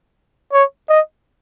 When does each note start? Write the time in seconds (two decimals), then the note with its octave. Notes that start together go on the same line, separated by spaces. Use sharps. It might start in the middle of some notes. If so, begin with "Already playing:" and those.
0.53 C#5
0.89 D#5